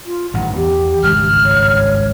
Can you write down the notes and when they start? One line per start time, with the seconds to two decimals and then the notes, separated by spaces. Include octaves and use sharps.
0.06 F4
0.34 A1 G2 D#3 F#5
0.56 E2 G4
1.03 G#1 C#2 G2 F6
1.44 C#5